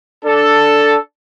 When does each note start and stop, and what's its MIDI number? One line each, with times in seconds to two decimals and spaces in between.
0.25 0.97 62
0.25 0.97 69